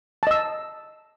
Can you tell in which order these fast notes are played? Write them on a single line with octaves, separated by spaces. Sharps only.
A5 D#5 E6